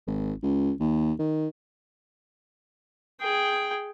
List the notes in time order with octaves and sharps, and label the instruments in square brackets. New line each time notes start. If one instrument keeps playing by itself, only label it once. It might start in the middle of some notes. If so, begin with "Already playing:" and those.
[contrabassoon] G#1
C#2
D#2
D#3
[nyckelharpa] G#4 G5